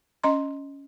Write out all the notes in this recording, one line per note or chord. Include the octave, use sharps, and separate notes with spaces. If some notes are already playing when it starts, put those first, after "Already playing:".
C#4 D#5 A#5 C6